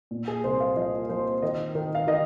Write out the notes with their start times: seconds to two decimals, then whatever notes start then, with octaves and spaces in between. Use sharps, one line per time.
0.11 A#2
0.28 G#4
0.44 C2 C5
0.60 F5
0.76 F3 D#5
1.09 F3 C5
1.42 D#3 D#5
1.75 D#3
1.95 F5
2.07 D#3 D#5